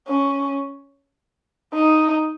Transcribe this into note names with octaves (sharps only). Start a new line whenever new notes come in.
C#4
D#4